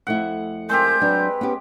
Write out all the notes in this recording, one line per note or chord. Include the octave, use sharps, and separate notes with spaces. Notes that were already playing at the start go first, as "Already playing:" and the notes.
F2 A3 E4 F#5
G#3 C4 G4 A#4 G6
F#3 D4 B4
B3 C#4 G4